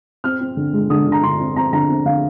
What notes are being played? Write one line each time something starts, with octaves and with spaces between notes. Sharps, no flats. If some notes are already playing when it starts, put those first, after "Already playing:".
C4 F6
C4
D3
G#3
D3 D#6
D3
A#5
D3 C6
C4
C4 A#5
D3 A#5
C4
D3 F5